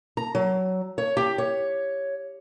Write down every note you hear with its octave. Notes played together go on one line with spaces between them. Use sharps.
A#5
F#3
C#5
G4
C#5